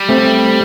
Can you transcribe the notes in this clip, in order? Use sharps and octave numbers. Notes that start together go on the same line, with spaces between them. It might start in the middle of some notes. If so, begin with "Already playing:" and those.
Already playing: G3
A3 C4